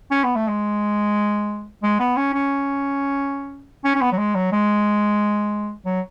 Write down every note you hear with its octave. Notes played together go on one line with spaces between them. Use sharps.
C#4
B3
A3
G#3
G#3
B3
C#4
C#4
C#4
C#4
B3
F#3
G#3
F#3
G#3
F#3